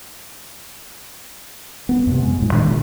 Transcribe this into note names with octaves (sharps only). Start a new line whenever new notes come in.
B3
F#2 C3
G#3
D2 A2
A#2 D#3 G#3 D4
D2 A#2